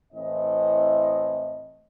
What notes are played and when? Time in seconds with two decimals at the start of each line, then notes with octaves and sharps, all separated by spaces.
0.13 A2 E3 C4 D#5